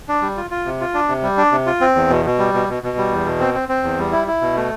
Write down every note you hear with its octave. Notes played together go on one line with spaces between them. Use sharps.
D4
G3
F4
F4
C3
F4
D4
C3
G3
D4
C3
F4
C4
E2
B2
B2
G3
B2
B2
B2
G3
E2
B2
C4
C4
C4
E2
G3
E4
E4
B2
A3